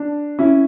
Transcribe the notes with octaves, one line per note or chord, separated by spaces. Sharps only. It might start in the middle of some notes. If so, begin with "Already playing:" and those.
Already playing: D4
C#4 E4